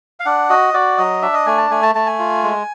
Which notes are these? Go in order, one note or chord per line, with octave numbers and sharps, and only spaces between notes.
F5
D4 F#5
F#4 D#5
F#4 D5
F#3 D#5
D4 E5
D#5
A3 G#5
A5
A3 G#5
A5
A3 A5
G#5
F4
G#3